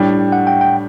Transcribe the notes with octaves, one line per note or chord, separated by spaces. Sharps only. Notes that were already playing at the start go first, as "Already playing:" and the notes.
Already playing: A2 G3 D4 G5
F#5
G5
G5